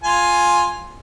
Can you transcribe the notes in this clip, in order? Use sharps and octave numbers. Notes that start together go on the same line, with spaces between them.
F4 G#5